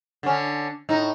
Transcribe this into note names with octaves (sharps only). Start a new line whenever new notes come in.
D3 C#4
A2 D#4